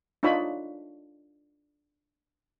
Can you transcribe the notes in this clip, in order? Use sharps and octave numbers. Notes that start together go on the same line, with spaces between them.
D4 D#4 F4 C#5 B5